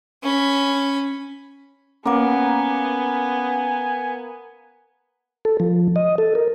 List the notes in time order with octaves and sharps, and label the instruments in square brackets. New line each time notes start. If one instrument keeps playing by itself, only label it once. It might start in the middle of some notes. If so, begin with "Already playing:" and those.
[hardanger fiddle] C#4 B5
[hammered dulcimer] A#3 [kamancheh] B3 [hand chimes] C#4 F#5 D6 [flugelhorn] G#5
[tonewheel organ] A4
F3
D#5
A4
A#4